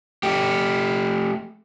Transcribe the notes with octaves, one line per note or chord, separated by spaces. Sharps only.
A3 G4